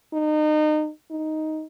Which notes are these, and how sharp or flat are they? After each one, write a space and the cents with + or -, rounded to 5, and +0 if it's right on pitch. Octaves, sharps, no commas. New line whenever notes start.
D#4 -30
D#4 +5